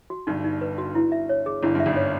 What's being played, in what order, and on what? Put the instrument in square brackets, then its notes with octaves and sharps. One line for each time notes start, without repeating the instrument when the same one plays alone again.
[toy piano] F#4
[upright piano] G1 G2 [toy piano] D#4
[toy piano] D#4
B4
F#4
E4
E5
C#5
G#4
[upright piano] G1 G2 [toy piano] E4
[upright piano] G2 [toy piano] E5
[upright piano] G#1 G#2
[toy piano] C#5